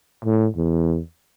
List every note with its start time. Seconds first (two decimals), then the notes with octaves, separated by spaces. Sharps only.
0.25 A2
0.56 E2